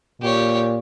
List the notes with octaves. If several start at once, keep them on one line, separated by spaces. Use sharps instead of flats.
A#2 G4 C#5